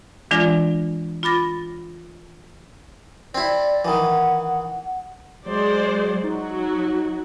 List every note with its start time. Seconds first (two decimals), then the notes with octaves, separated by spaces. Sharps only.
0.31 E3 G#3 D4 F4 D5 A#6
1.23 F4 B5 D6 A6 A#6
3.35 C4 E4 D5
3.85 D#3 E3 F#5
5.46 F#3 G#3 C5 D5
6.24 F#3 D#4 F#4